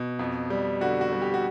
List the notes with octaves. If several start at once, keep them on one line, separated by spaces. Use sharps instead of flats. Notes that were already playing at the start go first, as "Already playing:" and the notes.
Already playing: B2
F2
G3
D3 F#4
F#4
G3
G4
F#4